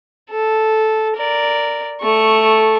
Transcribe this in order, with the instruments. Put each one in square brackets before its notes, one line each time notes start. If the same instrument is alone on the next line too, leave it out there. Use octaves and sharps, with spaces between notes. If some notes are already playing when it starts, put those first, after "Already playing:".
[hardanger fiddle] A4
A#4 D5
A3 C#6